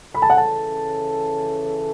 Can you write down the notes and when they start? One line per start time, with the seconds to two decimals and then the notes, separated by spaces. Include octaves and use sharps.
0.14 C#3 E3 C#4 A4 B5
0.22 A5
0.30 F#5
0.37 A5